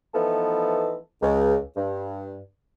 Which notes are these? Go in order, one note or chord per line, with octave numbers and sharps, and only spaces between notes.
E3 F3 A3 B3 D#4 A4
C#2
G2